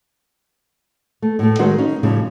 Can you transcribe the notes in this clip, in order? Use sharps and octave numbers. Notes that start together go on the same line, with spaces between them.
A3
A2 A3
D#3 F#3 G#3 F#4 A#4 C5
C#4 D#4
A2 C#3 F3 G3